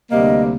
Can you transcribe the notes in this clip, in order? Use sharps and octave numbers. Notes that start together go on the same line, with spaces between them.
D2 C3 G3 A#3 D#5